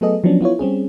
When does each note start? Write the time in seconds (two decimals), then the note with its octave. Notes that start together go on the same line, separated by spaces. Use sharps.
0.01 F#3 A3 B3 G#4 A4 D#5
0.24 F3 F#3 B3 C#4 D4
0.41 B3 E4 F4 C#5
0.59 G3 C4 C#4 G#4